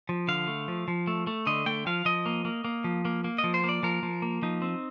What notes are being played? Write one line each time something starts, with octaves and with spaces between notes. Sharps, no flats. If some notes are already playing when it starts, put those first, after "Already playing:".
F3
D3 F5
A3
F3
F3
A3
A3
D3 D#5
A3 G5
F3 F5
F3 D#5
A#3
A#3
A#3
F3
A#3
A#3
D#5
F3
C5
A#3
D5
F3 A#4
F3
A#3
F3 D#4
C4